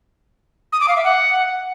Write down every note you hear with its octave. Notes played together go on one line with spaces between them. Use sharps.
D#6
D6
F5
E5
F#5